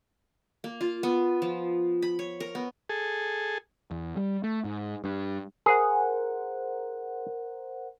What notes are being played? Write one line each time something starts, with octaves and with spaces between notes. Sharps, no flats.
A#3
F4
B3
F3
B5
C#5
A#4
B3
G#4 A4
E2
G3
A3
G#2
G2
G#4 A#4 C5 F#5